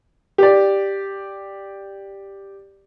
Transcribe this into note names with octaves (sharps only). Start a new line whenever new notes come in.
G4 D5